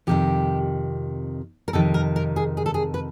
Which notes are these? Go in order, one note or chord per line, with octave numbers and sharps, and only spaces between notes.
F2 C3 D#3 G4
A#4
F2 C3 D#3 A4
A#4
A#4
G#4
G#4
A4
G#4
B4